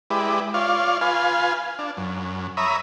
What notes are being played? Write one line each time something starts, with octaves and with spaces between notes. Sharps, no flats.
G#3 E4 G4 B4 D5
F4 C#5 D5 F5
F4 B4 F5 G#5
D4
F#2
C#5 E5 A#5 B5 D#6